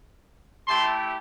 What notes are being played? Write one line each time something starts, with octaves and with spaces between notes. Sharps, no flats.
A3 E4 G4 A5 C6